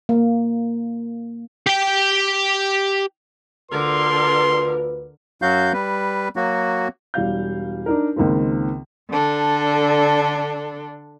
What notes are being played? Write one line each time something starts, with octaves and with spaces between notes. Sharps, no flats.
A#3
G4 G5
D2 D3 F4 A#4 B4 C6
F#2 F#3 F#4 F5 G6
G3 B4
F#3 A#3 F#4
E1 G3 F5 G6
D4 D#4 A#4
C#2 D#3 A#3 C4
D3 D4 A4